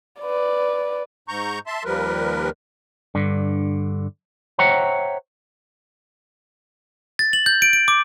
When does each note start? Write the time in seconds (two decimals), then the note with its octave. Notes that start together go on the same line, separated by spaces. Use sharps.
0.21 B4 D5
1.28 G#2 A#5 C#6 G6
1.67 E5 A5 C6
1.85 D#2 F3 G3 A#4 B4
3.15 G2 D3
4.59 C5 C#5 E5 F#5 G5 A#5
7.19 A6
7.33 F#7
7.46 G6
7.62 D7
7.73 D7
7.88 D6